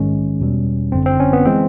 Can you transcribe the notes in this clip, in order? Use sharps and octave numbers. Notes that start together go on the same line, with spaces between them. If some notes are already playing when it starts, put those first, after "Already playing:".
Already playing: A#1 G#2 D#3 G#3 C#4
E2 B2 G3
G1 F#2 D3 C4
C4
C#4
B3
E3 G#3 C4